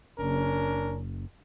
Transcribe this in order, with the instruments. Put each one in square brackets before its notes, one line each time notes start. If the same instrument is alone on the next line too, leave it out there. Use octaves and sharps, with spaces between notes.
[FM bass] F#1 [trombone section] C#4 D4 A#4